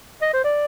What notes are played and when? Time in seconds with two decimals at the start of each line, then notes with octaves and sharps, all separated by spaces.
0.22 D#5
0.33 C5
0.44 D5